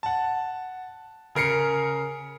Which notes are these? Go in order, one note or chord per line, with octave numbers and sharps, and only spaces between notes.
F#5 A5
C#3 A#4 C7 C#7